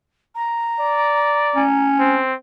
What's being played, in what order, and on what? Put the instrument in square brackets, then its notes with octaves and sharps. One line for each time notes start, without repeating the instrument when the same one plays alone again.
[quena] A#5
[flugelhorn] D5
[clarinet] C#4
[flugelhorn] C4